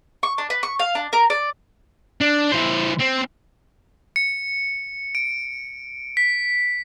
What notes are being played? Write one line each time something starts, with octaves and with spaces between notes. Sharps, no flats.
C#6
D4
B4
C#6
F5
D4
A#4
D5
D4
E3 C5
C4
C#7
D7
B6